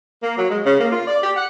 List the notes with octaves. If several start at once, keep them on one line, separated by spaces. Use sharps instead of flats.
A#3
F#3
G#3
C#3
A#3
F4
D5
G4
F#5